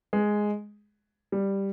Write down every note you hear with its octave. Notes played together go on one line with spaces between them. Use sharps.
G#3
G3